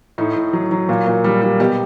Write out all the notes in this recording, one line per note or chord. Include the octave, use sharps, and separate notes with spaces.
A2 D#4
A2
F#3
F#3
A#2
A#2
G3
G3
B2 G4